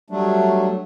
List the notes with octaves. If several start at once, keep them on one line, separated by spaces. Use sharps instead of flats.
F#3 G3 A3 D4